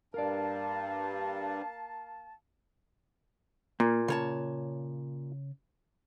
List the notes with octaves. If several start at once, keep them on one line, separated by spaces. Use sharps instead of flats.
G2 A#3 A#4 D5 F5 A5
A#2 A#3
C#3 C#5 A5